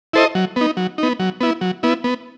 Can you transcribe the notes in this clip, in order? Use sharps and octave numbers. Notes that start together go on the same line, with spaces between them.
E4 A4 C5 D#5
F#3
B3 D#4
F#3
B3 D#4
F#3
B3 E4
F#3
B3 E4
B3